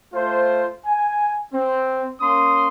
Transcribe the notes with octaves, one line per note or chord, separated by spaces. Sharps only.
A3 F4 C5
G#5
C4
A#3 C#4 C6 D#6